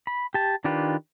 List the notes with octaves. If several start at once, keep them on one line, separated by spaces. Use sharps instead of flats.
B5
G4 A5
D#3 D4 F4 G4 B4